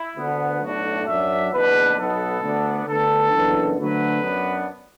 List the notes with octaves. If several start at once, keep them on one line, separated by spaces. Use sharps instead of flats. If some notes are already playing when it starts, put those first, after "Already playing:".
Already playing: E4
D2 D3 B3
B1 A2 A3 D4 F#4
F#2 F#3 D4 E5
F#1 E2 B2 B3 D4 B4
B1 B2 B3 A4
D2 D3 B3 D4
D2 D3 B3 D4 A4
F#1 F#2 E3 B3 D4
D2 D3 F#3 B4
F#2 F#3 B3 D4